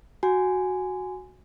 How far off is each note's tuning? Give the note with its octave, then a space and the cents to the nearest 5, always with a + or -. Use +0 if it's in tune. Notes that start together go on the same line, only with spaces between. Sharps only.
F#4 +0 G#5 +0